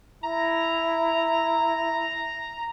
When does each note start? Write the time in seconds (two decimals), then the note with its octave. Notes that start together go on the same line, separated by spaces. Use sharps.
0.24 E4 A#5